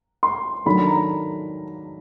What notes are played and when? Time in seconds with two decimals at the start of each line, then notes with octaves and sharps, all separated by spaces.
0.23 C6
0.65 D#3 F#3 A3 D4 B5
0.87 A#5